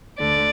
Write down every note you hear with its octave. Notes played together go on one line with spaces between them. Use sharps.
D2 D3 D5